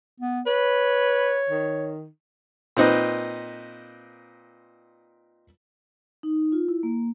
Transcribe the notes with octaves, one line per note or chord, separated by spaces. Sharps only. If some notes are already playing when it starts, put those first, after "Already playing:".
B3
B4 C#5
D#3
A#2 C4 D#4 B4
D#4
F4
E4
A#3